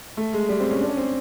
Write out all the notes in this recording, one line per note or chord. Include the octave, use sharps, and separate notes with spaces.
A3
G#3
G3
C4
C#4
D4
C#4
C4